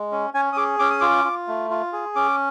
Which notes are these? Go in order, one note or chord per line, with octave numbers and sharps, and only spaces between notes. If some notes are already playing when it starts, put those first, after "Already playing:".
Already playing: G#3
C#4
C#4 G#5
D#6
G#4 D6
C#4 D6
D#6
F4 D6
F4
A3
F4
G#4
C#4 D6